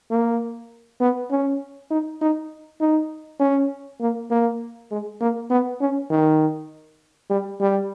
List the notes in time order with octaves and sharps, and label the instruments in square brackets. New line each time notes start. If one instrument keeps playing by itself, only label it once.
[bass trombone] A#3
B3
C#4
D#4
D#4
D#4
C#4
A#3
A#3
G#3
A#3
B3
C#4
D#3
G3
G3